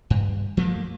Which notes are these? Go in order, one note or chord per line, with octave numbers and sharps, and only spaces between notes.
G2
F3 A3 A#3